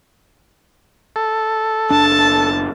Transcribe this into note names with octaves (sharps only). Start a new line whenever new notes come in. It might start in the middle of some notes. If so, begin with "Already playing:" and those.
A4
F#1 D4 A5